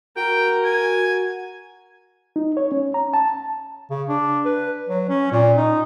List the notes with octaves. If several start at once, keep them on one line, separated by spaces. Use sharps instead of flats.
F#4 A#4 G5
G#5
D#4
C#5
C#4
A#5
A5
C#3
D4
B4
F#3
C#4
A#2
D#4